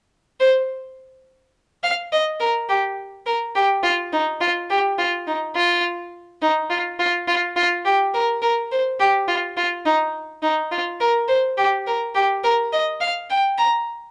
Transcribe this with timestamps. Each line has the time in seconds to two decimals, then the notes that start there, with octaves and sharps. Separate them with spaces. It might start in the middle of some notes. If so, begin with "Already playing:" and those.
0.40 C5
1.83 F5
2.12 D#5
2.40 A#4
2.69 G4
3.26 A#4
3.55 G4
3.83 F4
4.13 D#4
4.41 F4
4.70 G4
4.98 F4
5.27 D#4
5.56 F4
6.42 D#4
6.70 F4
6.99 F4
7.28 F4
7.56 F4
7.85 G4
8.14 A#4
8.42 A#4
8.72 C5
9.00 G4
9.28 F4
9.57 F4
9.86 D#4
10.43 D#4
10.72 F4
11.00 A#4
11.28 C5
11.58 G4
11.87 A#4
12.15 G4
12.44 A#4
12.72 D#5
13.01 F5
13.30 G5
13.58 A#5